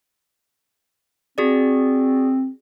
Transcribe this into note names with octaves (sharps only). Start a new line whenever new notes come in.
C4 F#4 G#4 D5